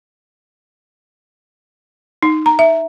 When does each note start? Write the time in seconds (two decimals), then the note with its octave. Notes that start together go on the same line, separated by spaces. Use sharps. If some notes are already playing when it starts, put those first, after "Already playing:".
2.23 D#4
2.46 A#5
2.59 E5